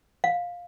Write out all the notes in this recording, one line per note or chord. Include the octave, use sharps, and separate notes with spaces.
F5